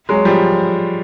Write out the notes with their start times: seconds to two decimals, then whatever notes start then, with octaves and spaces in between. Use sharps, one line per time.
0.09 F#3 G#3
0.25 F3 G3